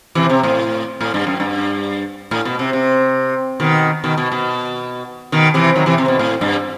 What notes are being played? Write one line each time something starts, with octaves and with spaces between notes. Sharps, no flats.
C3 E3
C3
A2
A2
G2
F#2
G2
A2
B2
C3
C3
B2 D#3
B2 D#3
B2
B2
B2 D#3
C3 E3
D#3 F#3
C3 E3
C3
B2
A2
G2